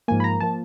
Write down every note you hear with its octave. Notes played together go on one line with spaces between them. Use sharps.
G#2 F3 A#3 G#5
B5
A#5
F3 A#3 A5